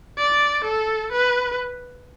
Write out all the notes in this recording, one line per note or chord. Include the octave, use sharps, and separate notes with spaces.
D5
A4
B4